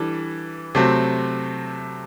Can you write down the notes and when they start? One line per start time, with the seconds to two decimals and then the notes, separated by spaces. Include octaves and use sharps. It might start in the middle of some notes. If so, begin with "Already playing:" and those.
Already playing: E3 G3 D4 A4
0.75 C3 F#3 A3 C4